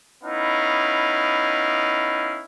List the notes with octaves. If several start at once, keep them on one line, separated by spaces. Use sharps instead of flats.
B3 C#4 D#4 E4 F5